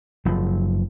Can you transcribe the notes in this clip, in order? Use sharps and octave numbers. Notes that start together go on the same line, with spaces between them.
F#1 F3